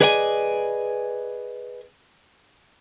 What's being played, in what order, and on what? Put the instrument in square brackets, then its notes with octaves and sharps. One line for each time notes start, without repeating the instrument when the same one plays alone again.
[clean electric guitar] G#4 B4 D5 D#5 F#5 G#5